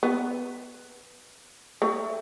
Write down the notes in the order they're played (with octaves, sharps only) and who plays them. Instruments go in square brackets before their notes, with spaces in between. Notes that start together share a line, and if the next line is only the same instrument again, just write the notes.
[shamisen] B3
A3